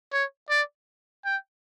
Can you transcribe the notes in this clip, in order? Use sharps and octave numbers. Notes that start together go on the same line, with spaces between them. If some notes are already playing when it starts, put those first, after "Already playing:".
C#5
D5
G5